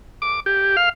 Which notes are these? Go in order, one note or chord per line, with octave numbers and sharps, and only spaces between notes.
D6
G4
F5